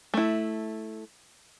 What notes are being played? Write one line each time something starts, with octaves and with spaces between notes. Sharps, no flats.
A3 E4